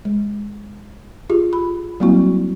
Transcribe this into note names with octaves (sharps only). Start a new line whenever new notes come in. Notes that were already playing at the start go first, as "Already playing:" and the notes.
G#3
F4 G4 G#4
B5
F#3 G3 A#3 C4 E4 F#4